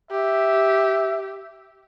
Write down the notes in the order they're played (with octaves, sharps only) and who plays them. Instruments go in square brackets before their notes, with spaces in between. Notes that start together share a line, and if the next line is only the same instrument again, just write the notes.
[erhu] G4 [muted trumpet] E5